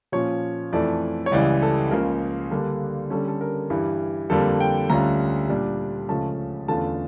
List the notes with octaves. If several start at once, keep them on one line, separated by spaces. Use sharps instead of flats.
A#2 F3 C#4 C#5
F2 E3 A3 D5
C#5
C#2 C#3 E3 G3 D5
A4
C#2 C#3 F3 A#3 A#4
D3 G3 A#3 D4
D3 G3 C#4 A4
A4
A#4
G2 E3 G3
F2 D3 G3 A#3 A4
G5
D2 D3 G3 C#4 F4 A#5
A#2 G3 D4
C#2 C#3 F3 A3 C#4 A5
E2 D3 A3 C#4 F4 A5